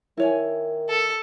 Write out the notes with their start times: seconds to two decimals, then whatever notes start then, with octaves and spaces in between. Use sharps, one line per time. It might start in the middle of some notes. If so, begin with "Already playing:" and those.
0.17 D#3 E4 C#5 G#5
0.88 A4